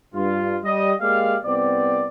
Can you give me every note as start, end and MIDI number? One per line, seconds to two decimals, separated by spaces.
0.14 0.58 43
0.14 0.58 65
0.64 0.91 55
0.64 0.91 75
1.00 1.36 56
1.00 1.36 58
1.00 1.36 67
1.00 1.36 74
1.00 1.36 77
1.44 2.08 36
1.44 2.08 59
1.44 2.08 60
1.44 2.08 74